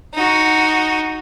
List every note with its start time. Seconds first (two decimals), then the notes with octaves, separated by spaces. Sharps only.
0.14 D#4 F#4